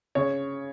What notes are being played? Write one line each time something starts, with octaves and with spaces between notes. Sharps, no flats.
C#3 C#5